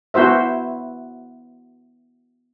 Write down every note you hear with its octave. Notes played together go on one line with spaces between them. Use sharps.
B3 E4 F#4 C5 E5